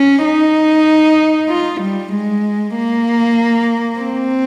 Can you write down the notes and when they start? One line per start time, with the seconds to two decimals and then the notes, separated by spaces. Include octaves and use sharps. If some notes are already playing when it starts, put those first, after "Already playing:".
Already playing: C#4
0.25 D#4
1.49 F4
1.81 G3
2.12 G#3
2.75 A#3
3.99 C4